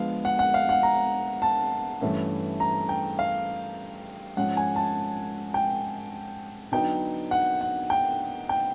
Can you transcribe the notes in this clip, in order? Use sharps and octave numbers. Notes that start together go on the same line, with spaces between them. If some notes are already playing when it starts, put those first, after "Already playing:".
Already playing: D3 F3 G#3 B3 F5
F#5
F#5
F5
F#5
A#5
A5
G2 E3 A3 C#4
A#5
G5
F5
G#2 F3 G#3 C#4 F#5
G#5
A5
G5
D3 F#3 B3 D#4 G5
F#5
F#5
G5
G5